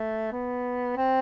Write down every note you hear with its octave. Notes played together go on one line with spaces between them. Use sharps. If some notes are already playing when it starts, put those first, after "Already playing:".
Already playing: A3
B3
C4